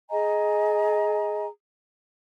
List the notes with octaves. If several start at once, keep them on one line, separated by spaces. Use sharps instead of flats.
G#4 D#5 G#5 A#5